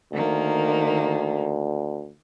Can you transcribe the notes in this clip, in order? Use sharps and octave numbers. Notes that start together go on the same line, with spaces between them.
D2 D#3 A#3